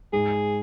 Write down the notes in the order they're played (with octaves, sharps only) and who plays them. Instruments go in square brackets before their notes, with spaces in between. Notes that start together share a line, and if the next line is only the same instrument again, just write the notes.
[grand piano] G#2 [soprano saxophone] G#4